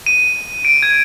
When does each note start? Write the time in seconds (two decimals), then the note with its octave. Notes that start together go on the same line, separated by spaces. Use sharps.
0.06 D#7
0.65 D7
0.83 G#6